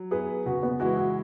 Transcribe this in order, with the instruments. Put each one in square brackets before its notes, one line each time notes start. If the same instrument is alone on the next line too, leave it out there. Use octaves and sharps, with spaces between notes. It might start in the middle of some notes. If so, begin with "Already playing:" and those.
Already playing: [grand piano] F#3
[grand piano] B3 E4 B4 [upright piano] G#4
[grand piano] C#3 [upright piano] F#4
[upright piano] B3
[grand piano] E3 G#3 E4 [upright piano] F#4
[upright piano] F#4